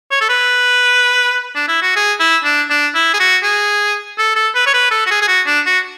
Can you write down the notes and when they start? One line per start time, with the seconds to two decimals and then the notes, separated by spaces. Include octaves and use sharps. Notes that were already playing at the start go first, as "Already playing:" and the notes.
0.11 C#5
0.21 A4
0.29 B4
1.56 D4
1.68 E4
1.82 F#4
1.96 G#4
2.20 E4
2.44 D4
2.70 D4
2.95 E4
3.14 G#4
3.19 F#4
3.43 G#4
4.18 A4
4.36 A4
4.55 B4
4.66 C#5
4.74 B4
4.91 A4
5.06 F#4
5.11 G#4
5.22 G#4
5.28 F#4
5.47 D4
5.66 F#4